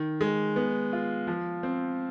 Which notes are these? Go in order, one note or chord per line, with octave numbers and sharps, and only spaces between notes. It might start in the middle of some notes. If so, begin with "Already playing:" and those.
Already playing: D#3
G#3
B3
F4
F3
C4